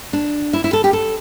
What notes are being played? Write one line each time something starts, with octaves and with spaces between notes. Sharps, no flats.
D4
E4
E4
A4
G4
A4